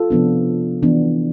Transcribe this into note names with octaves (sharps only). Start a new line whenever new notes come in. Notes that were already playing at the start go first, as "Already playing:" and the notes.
Already playing: F4 A4
C3 F3 B3 D4
E3 B3 D4